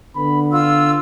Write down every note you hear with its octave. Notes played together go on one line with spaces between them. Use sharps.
D3 B3 B5
F4 E6